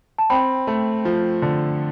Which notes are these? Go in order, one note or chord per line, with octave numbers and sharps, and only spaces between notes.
A5
C4 G5 B5
A3
F3
D3